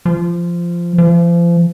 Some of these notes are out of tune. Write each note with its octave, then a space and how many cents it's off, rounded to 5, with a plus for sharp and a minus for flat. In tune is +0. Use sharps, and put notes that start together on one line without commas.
F3 -15
F3 -35